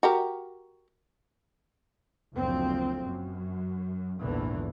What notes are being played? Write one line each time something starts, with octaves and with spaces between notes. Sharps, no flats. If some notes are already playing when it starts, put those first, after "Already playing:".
F#4 G4 A#4
F#1 D2 A#2 F3 C4
F#2
A#1 E2 G#2 D3 E3